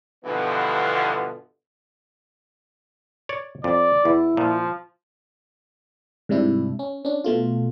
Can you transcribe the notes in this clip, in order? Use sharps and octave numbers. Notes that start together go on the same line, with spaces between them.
G2 B2 D3 E3 F3 B3
C#5 D5
F2 D5
E2 E4
A#2 F3
G#2 C3 G3 D4 E4
C#4
C#4 D4
B2 A3 F4